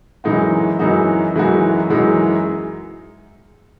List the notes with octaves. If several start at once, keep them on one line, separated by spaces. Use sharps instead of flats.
F#2 E3 G#3 D#4 F#4
F#2 E3 G#3 D#4 F#4
F#2 E3 G#3 D#4 F#4
F#2 E3 G#3 D#4 F#4